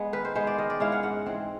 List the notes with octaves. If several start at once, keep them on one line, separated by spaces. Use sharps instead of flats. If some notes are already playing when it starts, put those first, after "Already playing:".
Already playing: G#3 B3
D#3 B4
C5
G#3 B3 C5
D5
D#3 D#5
D5
G#3 C#4 E4 F5
F#5
G#2 F#5
E3 G#3 C4